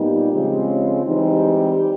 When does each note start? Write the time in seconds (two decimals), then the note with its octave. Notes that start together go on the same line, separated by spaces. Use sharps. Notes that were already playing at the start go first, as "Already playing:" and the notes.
Already playing: A#2 G3 B3 D#4 G4
0.31 C#3 F3 G#3 C4
1.05 E3 G3 G#3 C4 D#4 G4